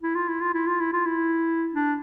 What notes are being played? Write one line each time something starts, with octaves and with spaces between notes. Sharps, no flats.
E4
F4
E4
F4
E4
F4
E4
F4
E4
D4